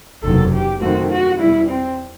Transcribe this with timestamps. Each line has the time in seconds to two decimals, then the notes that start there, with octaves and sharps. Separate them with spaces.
0.23 F#1 E2 C3 D#3 F#3 A4
0.52 G4
0.81 F#2 D#3 A3 C4 F#4
1.11 F#4
1.39 E2 B2 G3 E4
1.69 C4